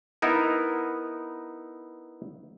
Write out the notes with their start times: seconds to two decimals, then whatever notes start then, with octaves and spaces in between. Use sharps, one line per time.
0.22 B3 D#4 E4 A#4